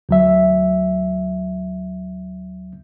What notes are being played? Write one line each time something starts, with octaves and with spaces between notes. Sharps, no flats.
D2 F#3 E5